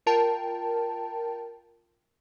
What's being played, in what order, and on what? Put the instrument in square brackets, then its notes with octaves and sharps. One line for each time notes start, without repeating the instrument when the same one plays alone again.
[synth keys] F4 A#4 G5 A5